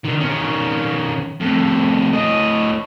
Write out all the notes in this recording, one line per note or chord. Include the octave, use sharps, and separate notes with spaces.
D3 D#3
D#3 C#4
F2 A2
A2 D#5